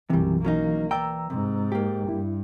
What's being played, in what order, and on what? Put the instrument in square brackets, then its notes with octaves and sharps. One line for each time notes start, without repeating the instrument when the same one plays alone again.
[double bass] B1 F#2 [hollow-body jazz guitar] C3 G3 [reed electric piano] E3
[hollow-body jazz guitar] F#3 C#4 D#4 [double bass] A#3
[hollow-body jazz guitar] E3 D5 G5 [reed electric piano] A#5 E6
[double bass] G#2 [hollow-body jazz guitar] C3
[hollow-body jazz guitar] A#3 G4
[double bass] G2 [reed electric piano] E4